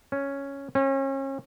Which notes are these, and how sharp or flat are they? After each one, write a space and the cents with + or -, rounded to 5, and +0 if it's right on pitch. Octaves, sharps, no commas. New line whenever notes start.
C#4 +0
C#4 -35